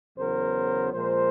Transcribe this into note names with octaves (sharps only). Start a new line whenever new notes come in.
E2 C#3 F#3 B3 A#4 C5
A#2 F3 G#3 A#4 C5